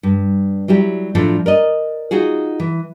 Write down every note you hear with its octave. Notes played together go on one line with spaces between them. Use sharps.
G2
F#3 G3 E4 G4
A2 F3 F#3 A3 D4 F#4
A#4 D5 D#5
D#4 F4 F#4 G#4
E3